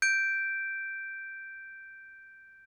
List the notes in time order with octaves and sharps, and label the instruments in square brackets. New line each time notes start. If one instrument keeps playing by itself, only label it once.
[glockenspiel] G6 D7